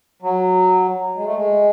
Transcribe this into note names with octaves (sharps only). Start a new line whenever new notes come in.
F#3
G#3
A3
G#3